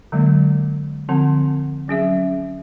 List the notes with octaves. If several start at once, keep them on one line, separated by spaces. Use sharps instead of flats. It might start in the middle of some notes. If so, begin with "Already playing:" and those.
D3 F#3 G#3 A#3
D3 F3 C4 F#5 A5
F#3 C#4 G#4 E5